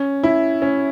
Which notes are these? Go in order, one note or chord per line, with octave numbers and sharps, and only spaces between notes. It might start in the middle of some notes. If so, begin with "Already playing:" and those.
Already playing: C#4
E4
C#4